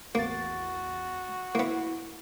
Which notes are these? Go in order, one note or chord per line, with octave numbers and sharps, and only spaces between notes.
A1 E2 A#3 F#4 A6
A#3 B3 E4